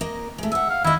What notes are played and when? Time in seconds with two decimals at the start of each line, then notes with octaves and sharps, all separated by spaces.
0.01 A#3 D#5
0.38 G#3 A3
0.52 E5 F#5 G#5
0.69 F5
0.84 D#3 E4 D#5